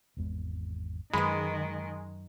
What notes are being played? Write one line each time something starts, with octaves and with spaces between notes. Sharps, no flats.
G#1 E2 G#3
F#2 D#3 G#3 B4 B5